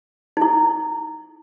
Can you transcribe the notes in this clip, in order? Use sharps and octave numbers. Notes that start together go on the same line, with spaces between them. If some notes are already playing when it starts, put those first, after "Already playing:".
D#4
E4